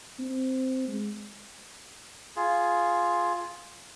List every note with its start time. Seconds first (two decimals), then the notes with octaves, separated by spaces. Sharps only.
0.19 C4
0.88 G#3
2.36 F4 G#4